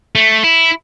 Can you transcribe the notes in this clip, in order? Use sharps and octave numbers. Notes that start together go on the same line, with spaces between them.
A3
E4